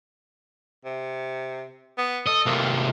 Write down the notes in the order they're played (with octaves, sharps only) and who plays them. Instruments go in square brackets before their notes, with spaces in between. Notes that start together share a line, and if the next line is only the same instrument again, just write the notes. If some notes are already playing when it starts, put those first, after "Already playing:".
[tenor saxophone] C3
B3
[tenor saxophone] A4 [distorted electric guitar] D#5
[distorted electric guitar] C3 A#3